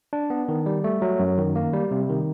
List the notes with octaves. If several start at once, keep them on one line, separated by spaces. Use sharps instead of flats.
D4
B3
D#3
G3
A3
F#3
F#2
D#3
A#3
G3
C3
D#3